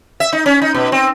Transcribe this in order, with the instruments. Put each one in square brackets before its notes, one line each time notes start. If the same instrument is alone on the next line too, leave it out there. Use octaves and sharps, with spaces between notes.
[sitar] E5
D#4
C#4
D#4
B2
C4